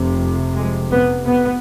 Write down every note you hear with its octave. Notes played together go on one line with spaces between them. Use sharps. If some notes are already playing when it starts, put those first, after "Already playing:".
Already playing: F1 F2 C3
G#3
B3
B3